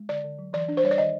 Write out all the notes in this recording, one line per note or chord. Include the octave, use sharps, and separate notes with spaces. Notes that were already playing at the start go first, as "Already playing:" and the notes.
Already playing: G#3
D3 D5
D3
F#3
E3 D5
D4
C5
G3 C#5
D5
D#3 D#5